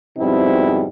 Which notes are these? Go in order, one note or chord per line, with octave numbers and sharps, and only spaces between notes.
F2 G#2 B2 G3 C4 E4